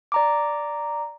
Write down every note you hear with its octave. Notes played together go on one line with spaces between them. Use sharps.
D5 A#5 D6